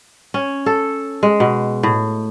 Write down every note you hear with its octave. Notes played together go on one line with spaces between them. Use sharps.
C#4
A4
G#3
B2
A2